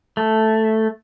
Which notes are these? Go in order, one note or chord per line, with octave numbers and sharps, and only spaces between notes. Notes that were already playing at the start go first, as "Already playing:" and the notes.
A3